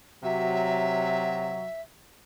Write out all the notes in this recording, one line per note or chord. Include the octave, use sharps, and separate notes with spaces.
C3 F#3 E5